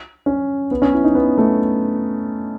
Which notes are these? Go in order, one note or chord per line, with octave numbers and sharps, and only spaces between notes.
C#4
B3
C#4
E4
D#4
B3
A3